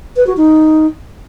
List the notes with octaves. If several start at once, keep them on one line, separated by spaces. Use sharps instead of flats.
B4
F#4
D#4